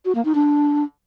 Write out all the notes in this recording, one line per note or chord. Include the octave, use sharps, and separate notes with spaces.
F#4
A#3
D#4
D4